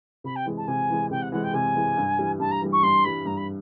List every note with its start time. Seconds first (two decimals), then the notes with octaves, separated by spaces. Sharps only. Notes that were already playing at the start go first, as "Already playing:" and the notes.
0.24 C3 B5
0.36 G5
0.46 E3 G#3
0.57 A5
0.68 C3 G#5
0.90 E3 G#3
1.11 C3 G5
1.22 F#5
1.32 E3 G#3 F#5
1.43 G5
1.54 C3 G#5
1.75 E3 G#3
1.97 G2
2.19 E3 G3
2.40 G2 A5
2.51 A#5
2.62 E3 G3
2.72 C#6
2.83 G2 C6
3.04 E3 G3 B5
3.26 G2 A#5
3.37 B5